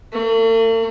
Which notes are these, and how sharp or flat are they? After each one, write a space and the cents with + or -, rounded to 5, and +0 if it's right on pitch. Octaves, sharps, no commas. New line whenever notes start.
A3 +45